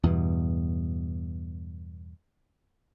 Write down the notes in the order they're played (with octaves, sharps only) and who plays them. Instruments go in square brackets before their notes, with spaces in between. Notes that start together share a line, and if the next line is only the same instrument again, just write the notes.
[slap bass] E2 G2 B2